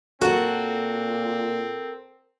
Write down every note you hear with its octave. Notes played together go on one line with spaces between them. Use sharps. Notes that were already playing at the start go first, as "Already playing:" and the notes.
A#2 C4 F#4 A4 A#4 F#5